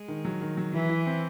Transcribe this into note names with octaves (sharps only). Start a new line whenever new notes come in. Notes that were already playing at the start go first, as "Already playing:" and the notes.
Already playing: G#3
D#3
F#3
D#3
F#3
E3 E4
E4
C4